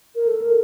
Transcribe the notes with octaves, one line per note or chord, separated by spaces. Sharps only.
A#4
A4
A#4